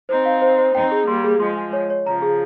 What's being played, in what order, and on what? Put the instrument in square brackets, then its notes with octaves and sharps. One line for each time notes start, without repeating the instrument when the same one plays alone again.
[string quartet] C4 D#4 [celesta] C5
[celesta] F5
C5
C5
[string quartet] C4 D#4 [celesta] G5
[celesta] G#4
[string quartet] G3 A#3 [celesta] C6
[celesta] G#4
[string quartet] F3 G#3 [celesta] C6
[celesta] G#5
C#5
C#5
[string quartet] C#3 F3 [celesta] A#5
[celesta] G#4